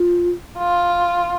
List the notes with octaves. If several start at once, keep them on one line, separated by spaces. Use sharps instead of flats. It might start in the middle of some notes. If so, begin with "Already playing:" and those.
Already playing: F4
F4